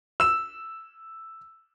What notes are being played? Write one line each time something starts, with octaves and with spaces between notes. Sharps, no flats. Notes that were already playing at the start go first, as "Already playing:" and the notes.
E6 E7